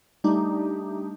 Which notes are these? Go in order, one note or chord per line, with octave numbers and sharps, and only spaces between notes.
G3 A3 D4 D#4 G4